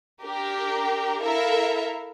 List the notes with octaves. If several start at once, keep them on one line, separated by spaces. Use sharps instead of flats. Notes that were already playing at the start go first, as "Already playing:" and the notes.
D4 G4 A#4
E4 A4 A#4 E5 F5